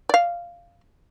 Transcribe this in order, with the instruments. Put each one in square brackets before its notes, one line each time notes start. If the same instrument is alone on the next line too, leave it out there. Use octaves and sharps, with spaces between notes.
[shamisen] D5 F5